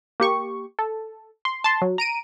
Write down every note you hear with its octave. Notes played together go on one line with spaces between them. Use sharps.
A#3 G4 C#6
A4
C6
A5 C6
F#3
A#5 D7 D#7